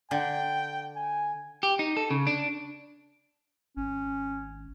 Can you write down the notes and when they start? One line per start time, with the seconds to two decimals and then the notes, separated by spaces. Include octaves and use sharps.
0.11 D3 G5
0.96 G#5
1.63 G4
1.79 D#4
1.97 A4
2.11 C#3
2.27 D4
3.77 G#1 C#4